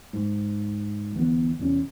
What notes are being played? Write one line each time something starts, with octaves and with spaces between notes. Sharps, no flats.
G#2
D2 E3 F#3 B3
E2 C3 C4 C#4